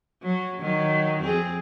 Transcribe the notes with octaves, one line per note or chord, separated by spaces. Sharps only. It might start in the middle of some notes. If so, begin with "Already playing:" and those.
F#3
D#3 F#3
F2 C4 G#4